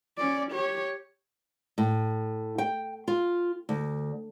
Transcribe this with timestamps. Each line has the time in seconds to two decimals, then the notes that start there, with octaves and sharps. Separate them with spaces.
0.17 C#4 D5
0.52 G4 C#5
1.78 A2
2.58 G5
3.08 F4
3.69 D2